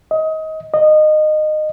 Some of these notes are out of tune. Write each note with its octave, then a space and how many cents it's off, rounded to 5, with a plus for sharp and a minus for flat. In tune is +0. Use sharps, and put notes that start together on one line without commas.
D#5 +25
D#5 -20